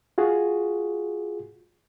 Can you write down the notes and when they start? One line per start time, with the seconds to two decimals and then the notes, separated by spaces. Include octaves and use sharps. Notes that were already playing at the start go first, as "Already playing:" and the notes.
0.18 F4 F#4 G#4